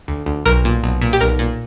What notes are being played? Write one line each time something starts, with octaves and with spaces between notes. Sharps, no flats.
D2
D2
B1 A#4
A#2
B1
A#2
G4
B1 A#4
A#2